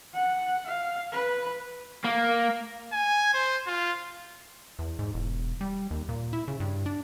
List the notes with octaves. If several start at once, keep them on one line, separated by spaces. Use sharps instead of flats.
F#5
F5
B4
A#3
G#5
C5
F4
E2
G#2
E1
G3
D#2
A#2
E4
C#3
G2
D4